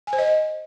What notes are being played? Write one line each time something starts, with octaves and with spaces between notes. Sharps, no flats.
G#5
C5
D#5